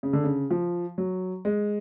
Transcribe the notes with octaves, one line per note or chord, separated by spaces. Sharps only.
C#3
D3
C#3
F3
F#3
G#3